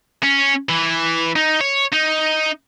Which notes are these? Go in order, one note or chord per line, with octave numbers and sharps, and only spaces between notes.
C#4
E3
D#4
C#5
D#4